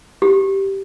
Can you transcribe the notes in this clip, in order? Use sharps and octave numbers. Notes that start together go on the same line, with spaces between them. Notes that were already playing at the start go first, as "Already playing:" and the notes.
G4